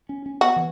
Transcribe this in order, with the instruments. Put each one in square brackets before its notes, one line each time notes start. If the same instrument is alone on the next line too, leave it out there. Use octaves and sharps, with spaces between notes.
[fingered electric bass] C#4
C#4
[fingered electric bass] B3 [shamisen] F#4
[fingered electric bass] E3